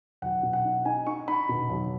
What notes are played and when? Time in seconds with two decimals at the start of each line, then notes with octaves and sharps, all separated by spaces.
0.22 B1 F#5
0.43 B2
0.53 F#5
0.65 D#4
0.85 D#4 G#5
1.07 D#4 C#6
1.28 D#4 B5
1.49 B2
1.69 B1